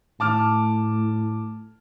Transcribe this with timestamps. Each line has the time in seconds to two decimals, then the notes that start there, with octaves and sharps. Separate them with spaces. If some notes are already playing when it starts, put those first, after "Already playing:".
0.20 A2 A5 D6 F6